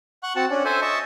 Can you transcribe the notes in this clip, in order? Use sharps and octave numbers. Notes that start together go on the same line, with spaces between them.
F#5 C#6 F#6
C4 F#4 F#5 A5
C#4 D4
A4 C5 E5 G#5
D#5 E5 A5 C#6